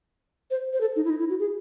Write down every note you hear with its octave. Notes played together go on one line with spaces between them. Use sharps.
C5
C5
A4
D#4
E4
D#4
E4
F#4
G#4